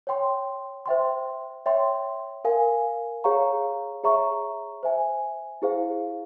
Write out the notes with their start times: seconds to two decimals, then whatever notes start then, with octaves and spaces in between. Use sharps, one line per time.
0.07 C#5 G5 C6
0.86 C5 E5 G5 C6
1.66 C#5 E5 G5 C6
2.45 A#4 F5 G#5
3.24 G#4 C#5 F5 A#5 C#6
4.03 G#4 C#5 E5 A#5 C#6
4.83 C5 E5 G#5
5.62 E4 G#4 C5 F5